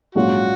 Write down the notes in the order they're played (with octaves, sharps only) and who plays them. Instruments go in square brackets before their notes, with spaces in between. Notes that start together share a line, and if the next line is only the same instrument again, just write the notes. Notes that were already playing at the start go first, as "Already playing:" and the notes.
[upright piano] A#1 G#2 F#3 C#4 F4 [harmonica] F#4